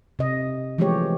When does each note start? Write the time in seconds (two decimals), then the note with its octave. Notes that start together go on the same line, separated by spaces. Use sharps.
0.19 C3 D#5
0.78 E3 F3 G#3 A3 G4 C#5